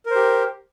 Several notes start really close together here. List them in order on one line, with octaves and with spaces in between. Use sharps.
A#4 C5 G4